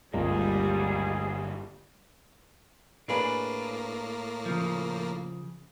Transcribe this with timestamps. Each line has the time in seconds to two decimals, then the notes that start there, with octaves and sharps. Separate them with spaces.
0.14 G1 C#2 F#2 G3 A#3 G#4
3.08 A2 A#3 D4 G#4 B4
4.46 C#3 F3